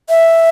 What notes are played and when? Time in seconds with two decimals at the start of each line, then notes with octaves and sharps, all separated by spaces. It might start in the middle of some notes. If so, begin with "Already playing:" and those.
0.10 E5